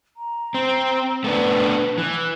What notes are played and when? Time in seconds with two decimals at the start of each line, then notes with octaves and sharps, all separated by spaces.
0.17 A#5
0.54 C4
1.24 A3 B3 D4 B4
1.98 E3 F#6